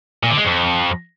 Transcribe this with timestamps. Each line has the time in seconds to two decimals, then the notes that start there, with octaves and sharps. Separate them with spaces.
0.23 A#2
0.30 D3
0.37 G#3
0.45 F2